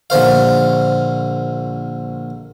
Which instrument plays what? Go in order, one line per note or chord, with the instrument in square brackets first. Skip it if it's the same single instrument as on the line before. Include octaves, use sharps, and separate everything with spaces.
[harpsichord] A#1 D3 C5 F5